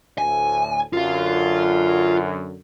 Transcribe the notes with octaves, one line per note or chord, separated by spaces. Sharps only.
D2 A2 G#5
F#2 D3 F4 F5